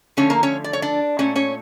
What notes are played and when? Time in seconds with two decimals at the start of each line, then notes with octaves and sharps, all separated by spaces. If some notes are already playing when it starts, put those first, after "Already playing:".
0.17 D3 F3 A3 C#4 C#5
0.30 A#3 A#4
0.43 C#4 C#5
0.64 D5
0.73 C#5
0.82 D4 D5
1.19 A#2 A3 C#4 C#5
1.36 C#4 C#5